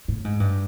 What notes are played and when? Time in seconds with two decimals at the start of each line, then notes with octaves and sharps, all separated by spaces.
0.08 A2
0.25 G#2
0.40 G2